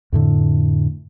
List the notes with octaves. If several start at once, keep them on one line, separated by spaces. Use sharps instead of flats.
F2 A2 D3